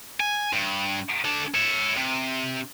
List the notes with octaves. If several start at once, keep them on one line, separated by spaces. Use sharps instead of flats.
G#5
G2
A3 D4
C#5 E5
C3